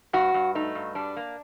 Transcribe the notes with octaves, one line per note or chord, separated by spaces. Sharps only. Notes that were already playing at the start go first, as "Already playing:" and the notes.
G2 F#4
G2
A3 D#4
G2
G3 D4
A#3